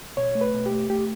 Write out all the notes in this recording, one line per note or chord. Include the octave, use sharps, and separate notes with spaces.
B2 C#5
A3
B4
B2
G4
A3
A3 G4